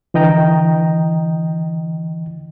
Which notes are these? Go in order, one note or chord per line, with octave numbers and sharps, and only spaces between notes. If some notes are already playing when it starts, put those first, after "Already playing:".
D3 E3 D#5 G5 A#5